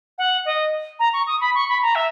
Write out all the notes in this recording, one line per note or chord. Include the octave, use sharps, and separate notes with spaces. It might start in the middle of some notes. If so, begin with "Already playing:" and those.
F#5
D#5
A#5
C#6
D#6
B5
C#6
B5
A#5
E5